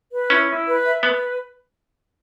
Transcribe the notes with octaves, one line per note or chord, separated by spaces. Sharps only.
B4
C#4 E4
E4
B4
E5
B3 B4